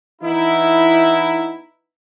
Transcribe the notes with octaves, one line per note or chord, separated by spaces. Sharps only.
E3 B3 D#4 E4